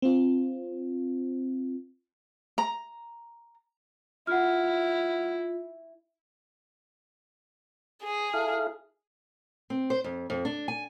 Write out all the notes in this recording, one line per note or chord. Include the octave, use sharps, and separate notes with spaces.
C4 F4
A#5
E4 F4 F#5 F6
G#4
E4 A4 F5
C4
C5
F2
F2
D4
G#5